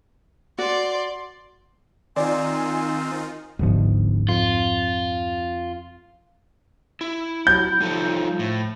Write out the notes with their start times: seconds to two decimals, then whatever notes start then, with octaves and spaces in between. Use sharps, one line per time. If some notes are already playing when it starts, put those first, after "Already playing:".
0.58 F#4 D5 C6
2.16 D#3 C4 D#4 F4 D5 G#5
3.59 G1 C#2 G#2 F3
4.29 F2 F4
7.01 E4
7.47 F#3 G6
7.80 F3 G3 D#4 A4
8.39 A2